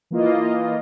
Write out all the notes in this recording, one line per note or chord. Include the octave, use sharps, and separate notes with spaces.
E3 A#3 F4 D#5